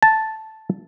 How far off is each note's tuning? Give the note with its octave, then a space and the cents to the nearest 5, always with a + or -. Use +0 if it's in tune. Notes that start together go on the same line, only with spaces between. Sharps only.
A5 -5